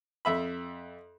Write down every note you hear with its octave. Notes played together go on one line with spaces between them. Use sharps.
F2 E5 B5